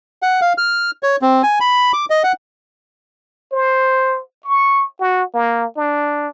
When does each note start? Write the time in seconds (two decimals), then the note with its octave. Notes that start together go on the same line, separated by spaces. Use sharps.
0.22 F#5
0.41 F5
0.58 F6
1.03 C#5
1.22 C4
1.43 G#5
1.60 B5
1.93 D6
2.10 D#5
2.24 F#5
3.52 C5
4.45 C#6
5.00 F#4
5.34 A#3
5.77 D4